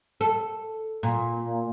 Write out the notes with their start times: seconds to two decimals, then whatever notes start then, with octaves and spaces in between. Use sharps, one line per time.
0.21 A4
1.03 A#2